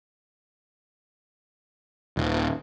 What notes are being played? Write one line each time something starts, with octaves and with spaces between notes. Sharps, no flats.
D#1